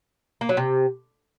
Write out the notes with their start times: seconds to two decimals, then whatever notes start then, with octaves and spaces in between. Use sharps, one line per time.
0.41 A#3
0.49 F#3
0.57 C3